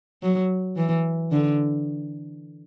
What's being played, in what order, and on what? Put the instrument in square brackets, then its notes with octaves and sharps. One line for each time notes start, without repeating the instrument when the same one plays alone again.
[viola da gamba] F#3
E3
D3